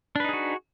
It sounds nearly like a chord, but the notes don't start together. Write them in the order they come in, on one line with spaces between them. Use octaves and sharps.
D4 B4 D#4 G#4 F#4